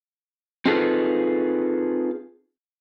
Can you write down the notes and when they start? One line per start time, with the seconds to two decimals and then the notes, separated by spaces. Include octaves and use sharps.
0.65 C4 D#4 F4 G#4 A4 B4